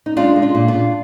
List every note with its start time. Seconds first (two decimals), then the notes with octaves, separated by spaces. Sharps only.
0.06 D#4
0.17 G#3 D4 F4
0.36 G#3
0.42 D4 F4
0.55 A#2
0.68 D4 F4
0.74 A#2